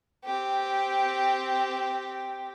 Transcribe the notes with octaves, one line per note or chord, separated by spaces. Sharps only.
C4 G4